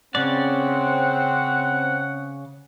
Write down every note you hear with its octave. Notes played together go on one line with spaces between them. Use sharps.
C#3 C4 C#4 D5 F#5